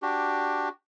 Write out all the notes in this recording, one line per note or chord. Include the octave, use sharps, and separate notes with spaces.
D4 F#4 G4